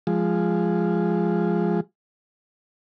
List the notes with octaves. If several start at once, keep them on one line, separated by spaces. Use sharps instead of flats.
F3 G#3